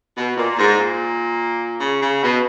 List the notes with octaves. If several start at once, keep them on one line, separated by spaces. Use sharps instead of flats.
B2
A#2
G#2
A#2
C#3
C#3
B2